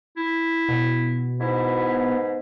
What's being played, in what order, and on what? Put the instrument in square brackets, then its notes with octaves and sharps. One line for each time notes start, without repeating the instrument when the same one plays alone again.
[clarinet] E4
[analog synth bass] B2
[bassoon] G#2 [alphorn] B3 [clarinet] E4